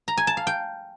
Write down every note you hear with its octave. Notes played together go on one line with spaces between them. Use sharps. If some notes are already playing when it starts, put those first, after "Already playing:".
A#5
G#5
A5
F5
G5